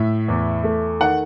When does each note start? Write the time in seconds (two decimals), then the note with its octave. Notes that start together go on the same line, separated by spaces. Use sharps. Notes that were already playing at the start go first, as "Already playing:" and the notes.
Already playing: A2 E5
0.28 E2
0.64 A3
1.00 D#3 F#5